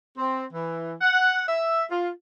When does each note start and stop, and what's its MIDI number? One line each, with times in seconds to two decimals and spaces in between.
0.17 0.44 60
0.53 0.95 52
1.01 1.42 78
1.47 1.84 76
1.90 2.09 65